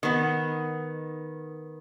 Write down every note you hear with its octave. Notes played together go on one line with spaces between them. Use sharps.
D#3 B3